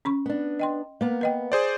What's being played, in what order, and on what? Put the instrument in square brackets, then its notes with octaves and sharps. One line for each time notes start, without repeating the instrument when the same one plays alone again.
[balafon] C#4 B5 C#6
[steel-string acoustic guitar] B3 D4
[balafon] D#5 G5 C6
[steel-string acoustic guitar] A#3 B3 A#5
[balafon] B4 D#5 G5
[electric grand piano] G#4 C5 D5